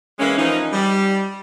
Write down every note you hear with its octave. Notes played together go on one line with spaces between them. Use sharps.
E3 G#3 A#3 C#4
E3 F3 D#4
G3